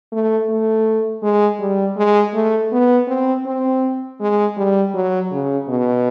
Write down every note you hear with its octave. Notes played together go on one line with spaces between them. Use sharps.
A3
A3
G#3
G3
G#3
A3
B3
C4
C4
G#3
G3
F#3
C#3
B2